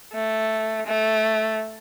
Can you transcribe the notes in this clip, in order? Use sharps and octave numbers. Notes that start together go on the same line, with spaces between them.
A3
A3